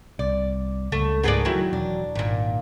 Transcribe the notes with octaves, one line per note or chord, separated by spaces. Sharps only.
C2 D5
C#2 A3
G#2 A3 B3 G#4 A#4 D5
D#3 F#3 E4
E1 D4
G#1 D#2 A#2